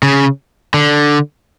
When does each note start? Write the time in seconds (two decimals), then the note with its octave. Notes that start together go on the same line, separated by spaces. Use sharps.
0.03 C#3
0.74 D3